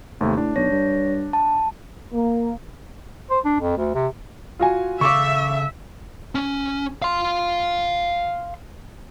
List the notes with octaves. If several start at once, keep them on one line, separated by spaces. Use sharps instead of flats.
G#1 D#2 C3 A3
A2 D4
B1 C#5 A#6
G2
A5
A#3
C5
D4
F2
D2
C3
F4 F#4 G#5
C#3 A4 E5 F5 C#6 D6
C#4
F5 C6